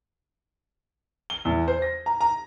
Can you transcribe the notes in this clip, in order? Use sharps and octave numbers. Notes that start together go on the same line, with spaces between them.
G7
E2
C5
A#6
A#5
A#5